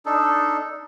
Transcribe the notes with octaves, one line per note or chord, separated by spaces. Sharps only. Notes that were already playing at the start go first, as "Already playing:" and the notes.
D4 D#4 A4